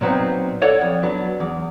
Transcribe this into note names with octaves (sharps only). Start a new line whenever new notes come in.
A#2 F#3 B3 C4 D#4
E4 A4 C#5 D5 F#5
F2
F#3 B3 D4
E2